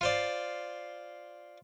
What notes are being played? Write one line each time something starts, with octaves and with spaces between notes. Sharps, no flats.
F4 C5 D5